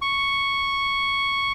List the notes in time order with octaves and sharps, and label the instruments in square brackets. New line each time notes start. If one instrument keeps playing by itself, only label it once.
[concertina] C#6